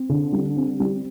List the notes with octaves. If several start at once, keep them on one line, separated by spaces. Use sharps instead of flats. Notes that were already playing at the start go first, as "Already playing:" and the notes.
Already playing: C4
D3
G3
C4
G3